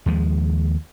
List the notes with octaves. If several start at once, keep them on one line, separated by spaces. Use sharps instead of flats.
D#2 F3 G#3